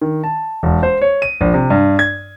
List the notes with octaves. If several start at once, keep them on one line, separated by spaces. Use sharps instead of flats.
D#3
A5
E1
C5
C#5
D#7
A#1
C3
G2
G#6